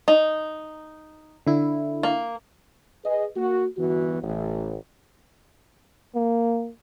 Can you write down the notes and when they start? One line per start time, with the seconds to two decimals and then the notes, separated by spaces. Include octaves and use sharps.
0.08 D#4
1.47 D3 E4
2.03 A#3
3.05 G#4 B4 D#5
3.36 A#3 F#4
3.77 G1 E3 B3 F#4
4.22 A1
6.15 A#3